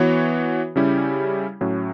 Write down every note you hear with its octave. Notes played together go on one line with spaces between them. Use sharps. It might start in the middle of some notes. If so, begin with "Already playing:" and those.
Already playing: E3 B3 F#4 C#5
C#3 G3 C#4 E4 G4
A2 F#3 C#4